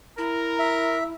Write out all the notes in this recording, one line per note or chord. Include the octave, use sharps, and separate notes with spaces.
E4 A#4 A#5
E5